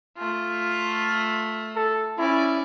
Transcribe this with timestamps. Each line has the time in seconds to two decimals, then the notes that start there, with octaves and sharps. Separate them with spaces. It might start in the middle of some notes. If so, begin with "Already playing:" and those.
0.17 A3 F4
1.76 A4
2.18 C#4 E4 D5